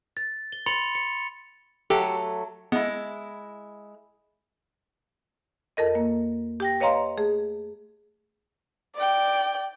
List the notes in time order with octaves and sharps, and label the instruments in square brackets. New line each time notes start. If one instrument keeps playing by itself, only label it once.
[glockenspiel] A6
G7
B5 C6 A6 C#7 F7
C#7
[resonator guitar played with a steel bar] F#3 A3 [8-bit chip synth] G4 A4 G5
[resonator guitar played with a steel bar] G#3 E4 [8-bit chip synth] B3
[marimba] F2 A4 A#4 D#5
A#3
G4 G5 A#6
B4 C#5 D#5 F5 A#5 C6
A3 G#4
[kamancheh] D5 G5